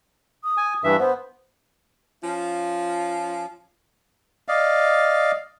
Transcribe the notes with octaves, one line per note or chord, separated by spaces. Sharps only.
D#6
G#5
G2 E3 E5
B3 C5
F3 C#4 F4
D5 D#5 F5